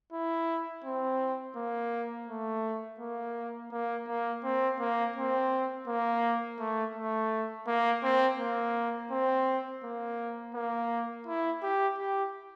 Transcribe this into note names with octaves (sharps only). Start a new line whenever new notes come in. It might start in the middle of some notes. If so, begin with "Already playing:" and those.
E4
C4
A#3
A3
A#3
A#3
A#3
C4
A#3
C4
A#3
A3
A3
A#3
C4
A#3
C4
A#3
A#3
E4
G4
G4